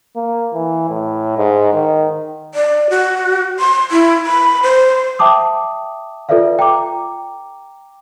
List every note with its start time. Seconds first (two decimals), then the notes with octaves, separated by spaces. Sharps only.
0.16 A#3
0.54 E3
0.89 A2
1.38 G#2
1.73 D#3
2.54 D5
2.90 F#4
3.59 C6
3.91 E4
4.25 B5
4.63 C5
5.19 E5 G5 A5 D6 D#6
6.29 F4 A4 B4 D5 E5 F5
6.59 G5 A#5 D6